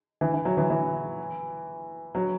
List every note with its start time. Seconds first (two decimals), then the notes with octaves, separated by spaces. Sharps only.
0.21 E3
0.34 E3
0.45 F#3
0.57 E3
0.70 E3
2.15 F#3